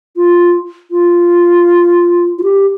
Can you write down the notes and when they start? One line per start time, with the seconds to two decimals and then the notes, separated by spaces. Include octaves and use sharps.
0.16 F4
0.91 F4
2.39 F4
2.43 G4